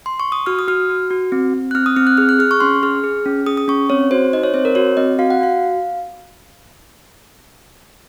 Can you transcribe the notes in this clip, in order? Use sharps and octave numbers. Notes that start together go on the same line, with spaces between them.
C6
C#6
D#6
F#4 F6
D#6
F#4 F6
F#4
F#4
C4
C4
F#6
C4 F6
D#6
C4 F6
F#6
G#4 F6
F#6
G#4 F6
C#6
C#4 C6
G#4 F6
G#4
C#4
G#4 D#6
D#6
C#4 C#6
C4 C#5
F#4 C5
D#4 D#5
C#5
C4 C5
A#4
F#4 C#5
C4 D#5
F#4 F5
F#5
F#4 F5